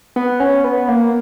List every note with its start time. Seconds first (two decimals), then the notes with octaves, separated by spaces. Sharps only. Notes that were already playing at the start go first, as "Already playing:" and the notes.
0.16 B3
0.40 C#4
0.64 B3
0.88 A#3